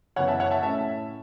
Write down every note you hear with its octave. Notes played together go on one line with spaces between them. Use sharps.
F#2 C#3 E3 B3 C#5 F#5
E5 A5
C#5 F#5
E5 A5
A2 A3 C#4 E5 A5